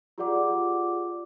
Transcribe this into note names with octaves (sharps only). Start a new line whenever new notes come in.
F4 G4 G#4 D5 F#5 D6